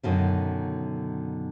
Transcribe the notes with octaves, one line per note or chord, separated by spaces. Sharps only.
F#2 B2 D3 D#3